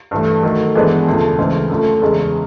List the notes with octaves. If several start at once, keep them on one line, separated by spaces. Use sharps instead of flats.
G2 E3 A3
D#3 F#3 A3
G2 E3 G#3 B3 D4
E1 D2 C#3 F3
D2 C#3 E3 G#3 C4
F#2 D3 F3 A3
E2 C#3 E3 G#3